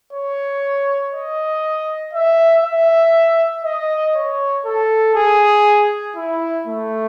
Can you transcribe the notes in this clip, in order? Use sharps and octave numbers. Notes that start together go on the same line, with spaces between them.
C#5
D#5
E5
E5
D#5
C#5
A4
G#4
E4
A3